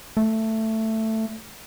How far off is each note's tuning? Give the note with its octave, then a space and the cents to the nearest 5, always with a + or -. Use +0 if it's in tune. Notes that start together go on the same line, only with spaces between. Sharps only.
A3 +10